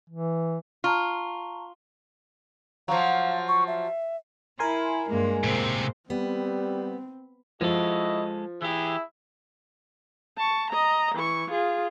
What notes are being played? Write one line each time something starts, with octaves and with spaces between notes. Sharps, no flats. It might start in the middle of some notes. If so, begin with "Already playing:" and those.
E3
F4 A5 A#5 C#6
F3 F#3 F5
C#6
E5
E4 A#4 G#5 C6
G2 G#3 A#3
A2 C3 A#3 C5
G3 B3 C4
F3 G#3 E4 F#4 A4 D#5
E3 E4 G4 G#4 E5
A5 C#6
D#5 A#5
E3 C#6
F4 G#4